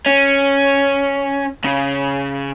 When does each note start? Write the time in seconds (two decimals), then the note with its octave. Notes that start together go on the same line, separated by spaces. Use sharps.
0.06 C#4
1.65 C#3